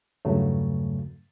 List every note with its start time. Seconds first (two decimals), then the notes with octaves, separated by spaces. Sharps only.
0.25 E2 G2 C#3 F#3 A3